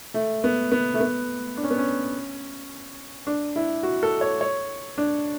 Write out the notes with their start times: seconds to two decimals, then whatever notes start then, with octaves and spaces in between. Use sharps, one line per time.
0.14 A3
0.44 B3
0.72 B3
0.94 A3
1.01 B3
1.57 D4
1.64 C#4
1.71 B3
1.78 C#4
3.27 D4
3.56 E4
3.83 F#4
4.03 A4
4.21 C#5
4.41 C#5
4.98 D4